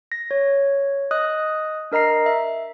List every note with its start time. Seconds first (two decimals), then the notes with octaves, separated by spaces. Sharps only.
0.12 A#6
0.31 C#5
1.11 D#5 D#6 F#6
1.92 D4 A#4 D#5 A#5 C7
2.26 E5